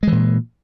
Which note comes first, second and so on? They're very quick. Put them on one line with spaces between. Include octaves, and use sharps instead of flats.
G#3 E3 A#2